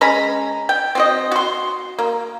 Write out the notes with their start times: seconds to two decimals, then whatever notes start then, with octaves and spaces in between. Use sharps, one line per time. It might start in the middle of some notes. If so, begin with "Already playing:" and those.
0.01 G#3 C#4 A#5 B5
0.69 G5
0.95 C4 F#4 D#5
1.31 F#4 C6
1.99 A#3